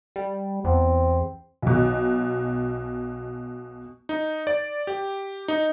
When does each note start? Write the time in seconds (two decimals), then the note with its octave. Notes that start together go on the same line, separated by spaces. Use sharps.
0.16 G3
0.64 E2 C4
1.62 B1 B2
4.09 D#4
4.47 D5
4.87 G4
5.48 D#4